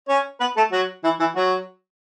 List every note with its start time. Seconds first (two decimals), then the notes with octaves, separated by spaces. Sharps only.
0.09 C#4 C#5
0.40 B3 B4
0.57 A3 A4
0.72 F#3 F#4
1.04 E3 E4
1.20 E3 E4
1.35 F#3 F#4